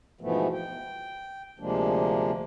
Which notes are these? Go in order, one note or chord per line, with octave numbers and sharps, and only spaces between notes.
G#2 B2 E3 F3 A3 B3
G5
D2 C3 F3 G#3 A#3 D4